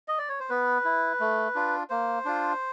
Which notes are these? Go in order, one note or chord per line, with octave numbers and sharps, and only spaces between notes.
D#5
D5
C#5
C5
B3 B4
E4
A3
D4 F4
A#3 C5
D4 F4